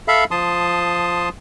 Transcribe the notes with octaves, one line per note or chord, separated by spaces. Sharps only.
A4 E5 F5 B5
F3 A5 C6 D#6